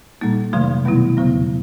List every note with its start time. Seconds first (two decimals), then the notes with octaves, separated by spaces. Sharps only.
0.21 A#2 G3 A#3 D#4
0.53 F2 C3 D#3 F#3 A3
0.85 B2 G3 B3 E4
1.17 E2 C#3 F#3 B3